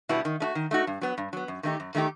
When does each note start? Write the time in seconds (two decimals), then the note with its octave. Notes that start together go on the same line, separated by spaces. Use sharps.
0.09 B2 G3 B3 E4
0.25 D#3
0.40 A3 D#4 F#4
0.55 D#3
0.71 A3 D#4 F#4
0.87 G2
1.01 F#3 B3
1.18 G2
1.33 F#3 B3
1.48 F#2
1.63 D#3 A3 D#4 G4
1.80 F#2
1.95 D#3 A3 D#4 G4